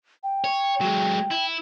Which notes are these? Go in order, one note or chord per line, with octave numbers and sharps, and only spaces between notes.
G5
C#5
F#3 G#3
E4